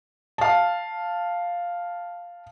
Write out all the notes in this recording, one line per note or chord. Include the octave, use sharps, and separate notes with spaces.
F5 A5